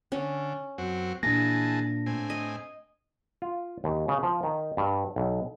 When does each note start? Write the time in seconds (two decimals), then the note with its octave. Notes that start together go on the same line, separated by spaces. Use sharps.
0.12 D3 C#4
0.78 F#2 C4 F#4
1.23 A#2 E3 A#3 D4 G#4 A5 A#6
2.06 A2 C4 G#5
2.30 D#5
3.42 F4
3.84 D#2
4.08 C#3
4.23 F3
4.43 D#3
4.77 G2
5.16 B1